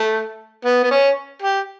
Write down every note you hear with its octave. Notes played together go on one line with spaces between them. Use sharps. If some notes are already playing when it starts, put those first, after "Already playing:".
Already playing: A3
B3
B3
C#4
G4